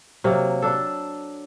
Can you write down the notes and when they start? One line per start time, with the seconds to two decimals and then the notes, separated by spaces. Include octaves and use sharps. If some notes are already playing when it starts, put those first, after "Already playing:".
0.24 C3 F#3 A#3
0.62 D4 A4